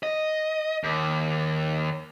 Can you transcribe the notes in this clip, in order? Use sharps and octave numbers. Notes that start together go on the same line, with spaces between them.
D#5
D#2